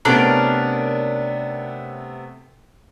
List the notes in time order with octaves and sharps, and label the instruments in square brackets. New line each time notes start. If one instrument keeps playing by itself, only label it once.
[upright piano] C3 A3 B3 [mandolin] C#4 D4 A#4